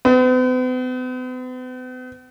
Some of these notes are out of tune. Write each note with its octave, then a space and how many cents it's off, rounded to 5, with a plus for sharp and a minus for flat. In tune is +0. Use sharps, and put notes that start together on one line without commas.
B3 +45